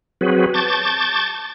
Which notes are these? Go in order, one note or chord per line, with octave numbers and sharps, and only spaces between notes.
F#3 C4 F#4 G#4 B4
A5 C#6 D6 G6 A6